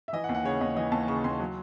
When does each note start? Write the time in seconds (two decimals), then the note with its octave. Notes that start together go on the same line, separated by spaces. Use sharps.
0.08 E5
0.13 E3 D#5
0.24 F#5
0.29 D#2
0.35 F#5
0.44 C#3 C#5
0.61 D#2 D#5
0.76 E3 D#5
0.92 D#2 A5
1.08 C#3 C#6
1.24 D#2 C6
1.39 F#3